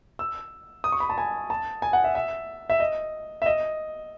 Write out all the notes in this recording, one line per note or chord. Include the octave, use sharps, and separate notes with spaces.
E6
D#6
C#6
B5
A5
G#5
A5
G#5
F#5
E5
E5
E5
D#5
E5
D#5